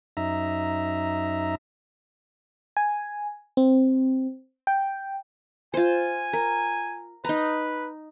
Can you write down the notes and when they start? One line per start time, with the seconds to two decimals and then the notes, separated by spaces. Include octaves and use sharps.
0.17 F#2 D#4 E5 A#5
2.77 G#5
3.57 C4
4.67 G5
5.74 F4 C5 G#5
6.33 A#4
7.25 D#4 B4 A#5